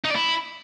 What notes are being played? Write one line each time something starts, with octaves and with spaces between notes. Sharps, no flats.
D#4
D5
E4